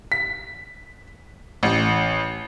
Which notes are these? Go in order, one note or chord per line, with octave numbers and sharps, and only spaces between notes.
B6
A1